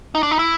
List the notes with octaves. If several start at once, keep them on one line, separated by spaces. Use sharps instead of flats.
D#4
D4
D#4
E4